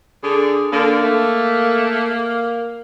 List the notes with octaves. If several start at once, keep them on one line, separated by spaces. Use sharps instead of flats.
D3 G#4
D3 A#3
A3